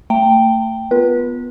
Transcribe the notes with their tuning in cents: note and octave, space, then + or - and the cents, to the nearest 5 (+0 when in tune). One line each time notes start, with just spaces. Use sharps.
A3 +35 G5 +0 A#5 -45
B3 +0 F4 +0 B4 -30